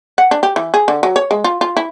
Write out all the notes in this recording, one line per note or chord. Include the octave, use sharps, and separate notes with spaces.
F#5
D4
G4
E3
G#4
D3
F#3
C#5
G#3
F4
F4
E4